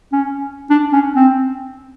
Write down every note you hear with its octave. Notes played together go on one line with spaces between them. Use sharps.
C#4
D4
C#4
C4